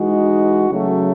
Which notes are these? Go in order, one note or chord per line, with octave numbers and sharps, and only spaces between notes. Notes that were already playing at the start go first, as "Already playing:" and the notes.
Already playing: E3 G#3 D#4 F#4
C#3 F#3 A3